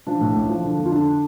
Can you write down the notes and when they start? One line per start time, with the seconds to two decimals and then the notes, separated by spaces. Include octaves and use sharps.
0.07 F3 D4
0.21 A2
0.36 A1
0.49 F3
0.64 D3
0.78 F2
0.85 F4
0.92 D3 D4